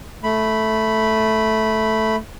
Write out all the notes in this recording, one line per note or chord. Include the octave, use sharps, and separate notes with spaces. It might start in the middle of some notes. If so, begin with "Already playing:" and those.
A3 B5